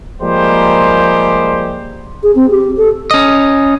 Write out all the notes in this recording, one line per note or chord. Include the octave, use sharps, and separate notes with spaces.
F3 G3 G#3 A#3 G4 C5
G#4
C4
G4
A4
C#4 D#5